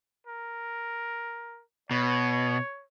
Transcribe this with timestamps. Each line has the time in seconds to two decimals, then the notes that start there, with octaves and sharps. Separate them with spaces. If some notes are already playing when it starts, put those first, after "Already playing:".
0.27 A#4
1.91 B2 C#5